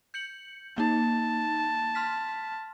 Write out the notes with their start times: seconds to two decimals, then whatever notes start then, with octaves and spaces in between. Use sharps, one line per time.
0.14 G6 C#7 F#7
0.78 A#3 D#4 A5
1.95 C6 F6 B6